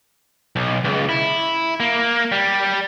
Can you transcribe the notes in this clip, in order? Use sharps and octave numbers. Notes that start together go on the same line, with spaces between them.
B1
C#2
E4
A#3
G3